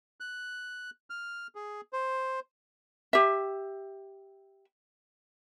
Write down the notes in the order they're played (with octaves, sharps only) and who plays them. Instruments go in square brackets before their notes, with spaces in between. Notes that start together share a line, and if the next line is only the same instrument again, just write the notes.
[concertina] F#6
F6
G#4
C5
[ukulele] G4 E5